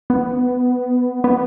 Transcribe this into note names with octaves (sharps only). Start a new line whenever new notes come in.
B3
B3